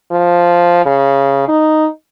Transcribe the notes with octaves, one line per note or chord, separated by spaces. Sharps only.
F3
C#3
D#4